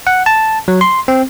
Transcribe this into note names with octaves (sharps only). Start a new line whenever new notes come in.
F#5
A5
F#3
C6
C4